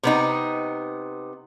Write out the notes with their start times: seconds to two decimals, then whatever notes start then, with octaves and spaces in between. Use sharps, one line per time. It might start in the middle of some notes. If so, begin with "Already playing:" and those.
0.03 C3 B3 D#4